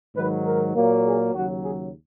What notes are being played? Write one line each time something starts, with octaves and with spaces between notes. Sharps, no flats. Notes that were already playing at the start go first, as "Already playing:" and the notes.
G#2 D#3 F#3 B4
A#4
A#2 F#3 A#3
G#4
D#2 C#3 F#3 F#4
G#4